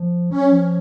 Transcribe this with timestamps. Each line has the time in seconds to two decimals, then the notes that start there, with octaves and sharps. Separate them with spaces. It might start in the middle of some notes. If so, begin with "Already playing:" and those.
Already playing: F3
0.30 F#3 C#4
0.51 F3